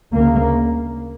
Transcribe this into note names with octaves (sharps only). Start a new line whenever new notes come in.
D2 C#3 A#3